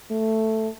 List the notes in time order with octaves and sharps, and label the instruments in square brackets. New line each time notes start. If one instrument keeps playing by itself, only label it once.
[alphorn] A3